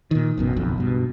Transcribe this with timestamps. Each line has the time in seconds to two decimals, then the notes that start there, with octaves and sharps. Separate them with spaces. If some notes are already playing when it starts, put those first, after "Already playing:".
0.11 A#2 D#3
0.38 G#1 F#2 B2
0.56 F#1 B1 F2
0.78 G2 B2